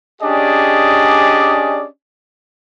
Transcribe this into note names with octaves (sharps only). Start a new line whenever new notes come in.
C#4 D4 G4 G#4 D5 D#5